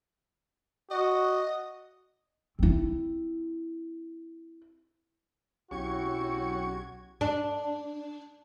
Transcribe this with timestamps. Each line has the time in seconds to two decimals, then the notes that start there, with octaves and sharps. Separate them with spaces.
0.91 F#4 D#5
2.59 C4 E4
5.71 B1 C#4 E4 F#4 G4 C#6 G#6
7.21 D4